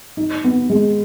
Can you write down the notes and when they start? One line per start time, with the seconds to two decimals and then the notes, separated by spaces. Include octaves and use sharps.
0.17 D#4
0.44 B3
0.70 G#3